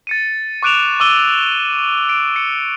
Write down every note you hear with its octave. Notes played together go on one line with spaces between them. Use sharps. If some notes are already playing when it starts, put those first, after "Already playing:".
A6 C#7 D#7
C#6 D6 F#6 D7 E7 F7
C#6 D6 E6 D#7 G7
D7
C#7